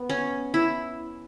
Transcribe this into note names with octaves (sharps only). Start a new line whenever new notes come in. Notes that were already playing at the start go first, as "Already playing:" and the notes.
Already playing: B3
C#4
E4